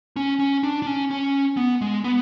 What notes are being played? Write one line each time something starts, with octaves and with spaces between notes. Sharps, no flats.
C#4
C#4
D4
D4
C#4
C#4
B3
G#3
B3